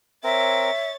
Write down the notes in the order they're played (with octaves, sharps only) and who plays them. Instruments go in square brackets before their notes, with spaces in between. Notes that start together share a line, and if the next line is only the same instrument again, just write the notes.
[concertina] C4 A#4 [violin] C#5 A6 [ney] E5